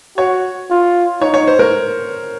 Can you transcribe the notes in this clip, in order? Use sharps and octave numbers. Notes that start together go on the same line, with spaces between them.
F#4 C#5
F4
D#4 C#5
C#5
C5
A#4